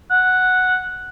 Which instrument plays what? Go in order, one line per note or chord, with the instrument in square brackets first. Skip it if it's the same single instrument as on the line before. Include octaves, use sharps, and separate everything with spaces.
[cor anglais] F#5